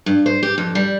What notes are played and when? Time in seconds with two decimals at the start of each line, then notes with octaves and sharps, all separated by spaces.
0.06 G2
0.26 C5
0.43 G4
0.58 F2
0.75 G3